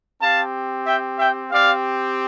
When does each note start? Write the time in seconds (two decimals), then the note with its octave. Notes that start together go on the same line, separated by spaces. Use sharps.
0.21 C4 G4 F5 A5
0.87 E5 G5
1.19 E5 G5
1.51 C4 G4 D5 F5